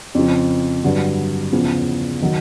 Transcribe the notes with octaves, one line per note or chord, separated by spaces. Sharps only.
F2 C#3 F3
G2 D3 F#3
E2 C#3 F3
D#3 F#3